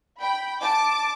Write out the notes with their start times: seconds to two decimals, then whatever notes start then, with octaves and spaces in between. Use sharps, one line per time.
0.20 G5 B5
0.61 A5 D6